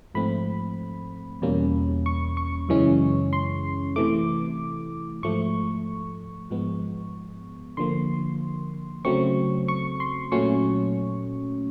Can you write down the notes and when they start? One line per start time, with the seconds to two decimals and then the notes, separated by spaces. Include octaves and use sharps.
0.15 G#2 F3 A3 C4 B5
1.42 E2 B2 G3 A#3 C#4
2.06 C#6
2.37 C#6
2.69 F#2 C#3 E3 G#3 C#4
3.33 C6
3.96 C3 E3 A3 D6
5.23 G#2 F3 A3 C#6
6.50 G#2 F3 G#3 B3
7.77 D3 F3 A#3 C6
9.05 C#3 F#3 A3 C4 C#6
9.68 C#6
10.00 C6
10.32 A#2 F#3 A3 C#4 C#6